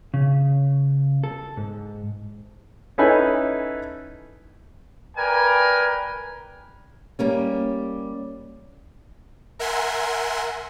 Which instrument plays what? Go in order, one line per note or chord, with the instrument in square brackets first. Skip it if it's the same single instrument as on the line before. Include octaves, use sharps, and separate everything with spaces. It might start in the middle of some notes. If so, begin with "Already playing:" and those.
[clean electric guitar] C#3
A4
G#2
[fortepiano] C#4 D#4 E4 A4 B4 G#5
[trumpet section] A#4 B4 D5 G5 G#5
[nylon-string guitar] G3 A#3 C#4
[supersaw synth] A#4 E5 F#5 G#5 C6